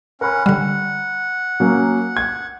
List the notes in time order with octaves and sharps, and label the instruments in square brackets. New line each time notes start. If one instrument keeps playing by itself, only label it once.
[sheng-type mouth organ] C#4 F#5 [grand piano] A#4 B5
[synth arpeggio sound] D3 G3 [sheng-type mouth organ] F#5
[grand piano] F#3 A#3 C#4
G#6